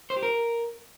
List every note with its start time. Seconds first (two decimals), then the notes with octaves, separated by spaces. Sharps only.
0.10 C5
0.16 G4
0.23 A#4